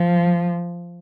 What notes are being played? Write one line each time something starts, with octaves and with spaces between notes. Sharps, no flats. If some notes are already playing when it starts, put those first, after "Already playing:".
Already playing: F3